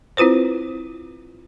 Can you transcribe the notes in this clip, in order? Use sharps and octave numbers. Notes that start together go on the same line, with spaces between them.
C4 E4 F4 B4 C5